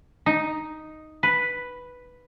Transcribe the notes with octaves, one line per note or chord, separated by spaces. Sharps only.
D#4
B4